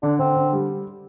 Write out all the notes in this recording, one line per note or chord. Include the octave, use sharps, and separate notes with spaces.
D3 D4
D3 C4
D3
G3